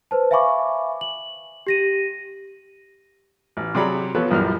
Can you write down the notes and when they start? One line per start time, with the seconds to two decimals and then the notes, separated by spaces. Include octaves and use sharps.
0.11 B4 C5 A5
0.31 E5 F5 G#5 B5 C#6 D6
1.01 F#7
1.67 G4 A#6 D#7
3.57 A1
3.75 C3 F#3 G#4 D5 B5
4.15 F3 B3 A4 B4 C#5
4.31 A#1 F#2 E3 G3 F6